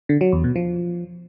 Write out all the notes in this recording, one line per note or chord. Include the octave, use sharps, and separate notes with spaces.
D3
F#3
E2
B2
F3